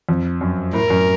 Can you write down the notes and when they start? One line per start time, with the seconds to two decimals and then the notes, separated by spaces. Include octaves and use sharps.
0.09 F2
0.41 F#2
0.73 A2 A#4
0.90 F#2